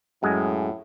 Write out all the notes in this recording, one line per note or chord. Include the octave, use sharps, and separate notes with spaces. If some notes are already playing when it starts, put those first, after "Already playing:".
F#2 A2 G#3